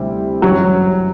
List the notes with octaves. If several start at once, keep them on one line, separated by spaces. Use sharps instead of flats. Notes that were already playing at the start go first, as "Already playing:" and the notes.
Already playing: D2 C3 G3 C4 E4
G1 F#2 E3 F#3 G3 D4